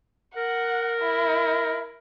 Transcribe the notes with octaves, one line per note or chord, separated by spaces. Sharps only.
A#4 F#5
E4